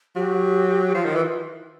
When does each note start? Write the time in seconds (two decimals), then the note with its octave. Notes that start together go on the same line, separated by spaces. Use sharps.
0.16 F#3 G4
0.95 F3 F4
1.05 D#3
1.15 E3